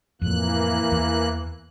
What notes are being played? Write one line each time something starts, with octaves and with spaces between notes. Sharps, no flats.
F2 A2 E3 A#3 F#6
E2